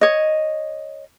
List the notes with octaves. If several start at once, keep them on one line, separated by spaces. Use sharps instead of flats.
C#5 D#5